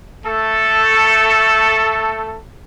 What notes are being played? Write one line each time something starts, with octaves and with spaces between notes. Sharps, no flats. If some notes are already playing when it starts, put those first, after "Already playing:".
A3 A4